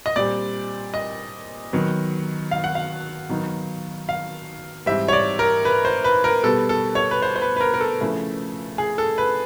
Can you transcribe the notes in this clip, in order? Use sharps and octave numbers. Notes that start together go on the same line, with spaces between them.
D#5
A#2 G3 C4 D5
D#5
D#3 F#3 B3
F5
F#5
F5
D#3 F#3 B3 D#4
F5
G#2 E3 G3 C4 E5
C#5
D5
A#4
B4
C5
B4
A#4
B2 G3 B3 A4
A4
C#5
B4
C5
C5
B4
B4
A#4
A#4
A4
C#3 F3 A3 C#4 E4
G#4
A4
B4